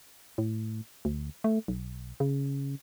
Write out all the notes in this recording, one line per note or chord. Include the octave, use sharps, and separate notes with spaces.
A2
D2
A3
B1
C#3